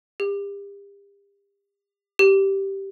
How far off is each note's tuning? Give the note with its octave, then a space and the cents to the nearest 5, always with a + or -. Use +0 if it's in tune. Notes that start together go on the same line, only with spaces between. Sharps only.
G4 +40
G4 -5